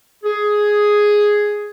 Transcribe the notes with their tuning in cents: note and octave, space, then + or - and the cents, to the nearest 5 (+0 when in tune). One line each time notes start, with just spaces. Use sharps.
G#4 +5